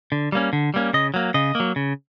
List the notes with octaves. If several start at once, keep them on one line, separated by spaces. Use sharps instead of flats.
D3
G3 A#3 C#4
D3
G3 A#3 C#4
C#3 D#5
F#3 A#3
C#3 D#5
F#3 A#3
C#3